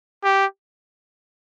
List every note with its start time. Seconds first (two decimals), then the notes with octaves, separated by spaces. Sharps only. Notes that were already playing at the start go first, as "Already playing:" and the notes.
0.24 G4